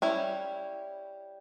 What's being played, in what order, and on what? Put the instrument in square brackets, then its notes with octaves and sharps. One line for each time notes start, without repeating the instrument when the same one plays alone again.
[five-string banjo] G3 C#4 E4